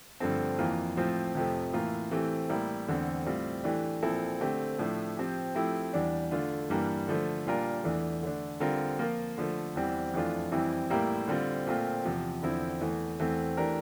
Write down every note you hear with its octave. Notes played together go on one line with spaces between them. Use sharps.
G2 D3 F3 A3 C4
F2 E3 A#3 F4
A2 F3 C4 F4
F2 C3 F3 A3
A2 E3 A#3 F4
E3 A3 C4 G4
A2 G3 A#3 E4
E2 D3 A3 C4
A2 G3 C4 F4
E3 A3 D4 G4
A#2 F3 C4 E4 A4
D3 A3 C4 G4
A2 F3 A3 D4
F3 C4 G4
F3 A3 C4 E4 G4
E2 E3 G3 D4
D3 A3 D4 F4
G2 E3 G3 A#3 D4
D3 F3 A3
A#2 G3 D4 F4 A#4
E2 E3 A3 D4
D3 A3 D4
D3 G3 C4 F4 A#4
F3 A#3 F4 A#4
D3 F3 A3
E2 E3 G3 C4
F2 E3 A3 D4 F4
F2 E3 G3 C4 E4
A2 G3 A#3 E4 G4
D3 G3 C4 F4
A#2 A3 C4 F4
E2 C3 F3
E2 D3 F3 C4 E4
E2 E3 A3
E2 E3 A3 C4
E3 A3 D4 G4 A#4